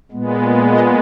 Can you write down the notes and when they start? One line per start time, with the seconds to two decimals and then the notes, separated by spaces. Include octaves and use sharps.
0.11 A#2 G#3 B3
0.70 D#5